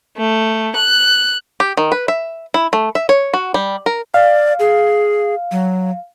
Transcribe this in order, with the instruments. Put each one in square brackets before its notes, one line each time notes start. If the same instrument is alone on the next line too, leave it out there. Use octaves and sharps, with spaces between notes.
[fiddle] A3
F#6
[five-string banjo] G4
D#3
B4
E5
E4
A3
E5
C#5
F#4
G3
A#4
[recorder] D5 [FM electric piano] F5
[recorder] G#4
F#3